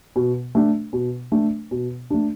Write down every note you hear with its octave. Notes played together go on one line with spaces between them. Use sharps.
B2
A3 D4
B2
A3 D4
B2
A3 D4